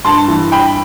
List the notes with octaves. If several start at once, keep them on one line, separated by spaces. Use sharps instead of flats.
G2 A5 C6
E3
G2 G5 B5